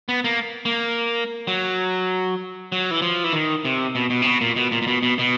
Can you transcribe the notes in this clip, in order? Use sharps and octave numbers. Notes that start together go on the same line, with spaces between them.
B3
A#3
A#3
F#3
F#3
E3
F3
E3
D#3
C3
B2
B2
C3
B2
A#2
B2
A#2
A#2
B2
B2
B2